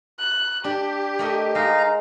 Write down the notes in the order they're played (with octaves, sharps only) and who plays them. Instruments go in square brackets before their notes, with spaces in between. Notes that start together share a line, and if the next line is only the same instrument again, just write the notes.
[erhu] F#6
[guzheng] D4 [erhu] G4
[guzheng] A3 A#4 D#5
[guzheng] G#3 [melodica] D#4 F5 A#5